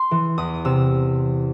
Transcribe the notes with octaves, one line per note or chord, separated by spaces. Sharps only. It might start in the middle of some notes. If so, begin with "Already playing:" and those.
Already playing: C6
E3
E2 D#6
C3 E6